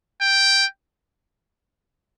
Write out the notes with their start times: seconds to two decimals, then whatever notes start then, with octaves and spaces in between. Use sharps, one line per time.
0.21 G5